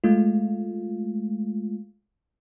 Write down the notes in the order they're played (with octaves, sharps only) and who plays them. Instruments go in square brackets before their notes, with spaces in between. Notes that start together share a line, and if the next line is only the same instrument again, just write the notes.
[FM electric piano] G#3 A3 F4